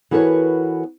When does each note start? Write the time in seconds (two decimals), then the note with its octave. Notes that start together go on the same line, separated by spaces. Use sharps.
0.11 E3 B3 F#4 A4 A#4 C#5